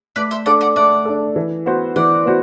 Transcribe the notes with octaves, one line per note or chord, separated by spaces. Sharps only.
A3 B4 D5
C5 E5
D4 A4 D5 F#5
D5 F#5
A3 D5 F#5
D4 A4
E3
B3 F#4 C5
E3 D5 F#5
B3 F#4 C5